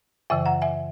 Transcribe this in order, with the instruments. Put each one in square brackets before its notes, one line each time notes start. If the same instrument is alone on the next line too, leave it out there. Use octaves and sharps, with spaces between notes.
[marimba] F#2 C#3 E3 E5 G#5
F#5 A#5
E5 G#5